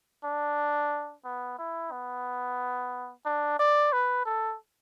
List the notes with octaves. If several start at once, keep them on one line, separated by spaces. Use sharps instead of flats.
D4
B3
E4
B3
D4
D5
B4
A4